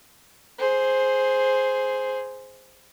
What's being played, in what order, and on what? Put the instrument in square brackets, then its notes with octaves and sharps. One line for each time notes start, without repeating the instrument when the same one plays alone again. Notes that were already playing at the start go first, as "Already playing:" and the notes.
[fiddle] G#4 C5